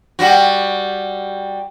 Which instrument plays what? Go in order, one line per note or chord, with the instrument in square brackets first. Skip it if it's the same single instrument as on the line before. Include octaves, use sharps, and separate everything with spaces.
[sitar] G3 F#4